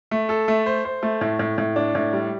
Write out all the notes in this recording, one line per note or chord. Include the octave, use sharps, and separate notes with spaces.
A3
A4
A3
C5
C5
A3
A2
A2
A2
D4
A2
G3